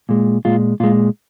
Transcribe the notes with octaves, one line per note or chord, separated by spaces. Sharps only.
A#2 G#3
A#2 G#3 F4
A#2 G#3 F4